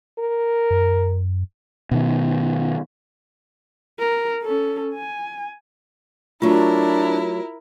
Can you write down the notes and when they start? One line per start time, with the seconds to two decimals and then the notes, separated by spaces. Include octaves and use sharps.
0.19 A#4
0.70 F#2
1.91 B2 D#3
3.99 A#4
4.43 C#4 A4
4.94 G#5
6.42 F#3 A3 D4 E4 F4 A#4